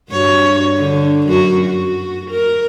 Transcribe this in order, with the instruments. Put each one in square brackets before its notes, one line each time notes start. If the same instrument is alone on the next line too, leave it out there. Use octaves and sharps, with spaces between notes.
[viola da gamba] G2 F#4 C#5
D3
F#2 F#4
F#4
A#4